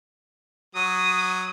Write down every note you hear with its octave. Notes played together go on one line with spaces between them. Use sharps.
F#3 D#6